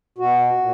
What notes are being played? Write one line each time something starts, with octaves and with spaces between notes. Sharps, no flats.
B2 F#4
A#2